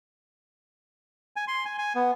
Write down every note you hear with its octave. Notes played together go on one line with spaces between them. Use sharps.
G#5
C6
G#5
G#5
B3